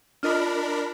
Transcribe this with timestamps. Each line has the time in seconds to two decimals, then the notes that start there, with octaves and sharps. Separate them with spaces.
0.23 D4 F4 A#4 D#5 B5 D#6